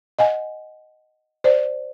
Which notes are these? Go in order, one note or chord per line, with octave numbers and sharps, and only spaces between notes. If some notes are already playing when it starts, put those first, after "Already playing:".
D#5 F#5 G#5
C5 D5